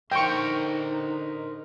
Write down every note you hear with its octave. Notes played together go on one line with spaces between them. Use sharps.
D3 D#4 A#4 C5 G5 C#6